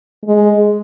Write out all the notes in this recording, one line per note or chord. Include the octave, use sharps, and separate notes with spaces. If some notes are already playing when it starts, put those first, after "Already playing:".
G#3